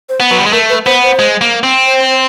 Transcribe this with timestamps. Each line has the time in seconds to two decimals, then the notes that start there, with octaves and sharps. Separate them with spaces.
0.09 C5
0.20 B3
0.31 F#3 B4
0.38 G3
0.46 G#3
0.53 A3 A#4
0.69 B4
0.86 B3 C5
1.03 C5
1.19 G#3
1.41 A#3
1.63 C4
1.86 C5